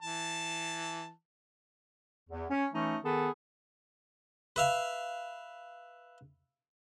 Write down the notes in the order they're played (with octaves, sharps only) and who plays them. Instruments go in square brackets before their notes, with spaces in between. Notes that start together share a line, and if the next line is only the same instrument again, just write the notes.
[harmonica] E3 A5
[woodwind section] E2
C#4
E3 A3 C#4 D#4
D#3 B3 G#4 A4
[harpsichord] B4 E5 F5